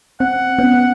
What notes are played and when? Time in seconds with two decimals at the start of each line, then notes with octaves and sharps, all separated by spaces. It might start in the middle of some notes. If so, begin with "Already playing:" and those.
0.20 C4 F#5
0.59 B3 C#4